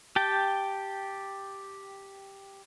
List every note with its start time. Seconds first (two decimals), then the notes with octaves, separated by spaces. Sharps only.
0.16 G4 G5 A5